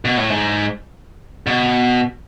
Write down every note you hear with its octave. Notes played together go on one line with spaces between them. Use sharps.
B2
A2
G#2
B2